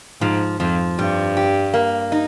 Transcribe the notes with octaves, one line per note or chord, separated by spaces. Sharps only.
G#2 F3
F2 F3
G2 G3
G4
A#3
D#4